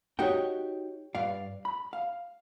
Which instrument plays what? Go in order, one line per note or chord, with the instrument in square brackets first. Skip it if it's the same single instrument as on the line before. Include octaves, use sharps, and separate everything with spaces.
[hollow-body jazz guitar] D#4 F#4 G5 [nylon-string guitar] G4 C#5
[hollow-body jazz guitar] G2 D5 F5
B5
F5